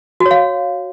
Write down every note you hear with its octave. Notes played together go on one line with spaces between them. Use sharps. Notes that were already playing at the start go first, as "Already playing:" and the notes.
F#4
C#5
F5